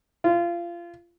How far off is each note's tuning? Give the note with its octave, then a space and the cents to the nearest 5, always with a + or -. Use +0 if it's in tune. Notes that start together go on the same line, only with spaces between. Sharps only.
F4 -25